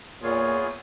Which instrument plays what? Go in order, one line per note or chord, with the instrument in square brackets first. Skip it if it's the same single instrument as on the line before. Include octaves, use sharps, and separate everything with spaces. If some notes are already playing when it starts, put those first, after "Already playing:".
[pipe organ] E2 F4 G#4 [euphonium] A#2 [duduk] C#5